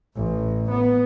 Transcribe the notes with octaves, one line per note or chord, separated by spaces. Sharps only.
A1
B3